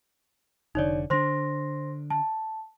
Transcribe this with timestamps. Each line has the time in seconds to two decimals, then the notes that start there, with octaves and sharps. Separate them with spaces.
0.75 F1 D3 D#4 C#5 D5
1.10 D3 D4 C5 C6 A#6
2.10 A5